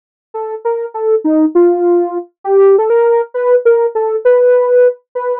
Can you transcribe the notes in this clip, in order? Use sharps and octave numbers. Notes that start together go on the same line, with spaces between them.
A4
A#4
A4
D#4
F4
G4
A4
A#4
B4
A#4
A4
B4
B4